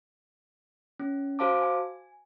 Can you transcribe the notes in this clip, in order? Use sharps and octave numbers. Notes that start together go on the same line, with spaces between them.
C#4
F#4 C5 F5 A5 D6
G#5